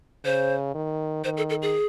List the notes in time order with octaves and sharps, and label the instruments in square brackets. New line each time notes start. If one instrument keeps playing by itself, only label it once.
[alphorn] C#3 [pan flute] C5
[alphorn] D#3
[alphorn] D#3 [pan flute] C5
[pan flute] A4
A4
G#4